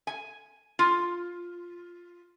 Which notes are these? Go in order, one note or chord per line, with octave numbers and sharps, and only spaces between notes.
G#5
F4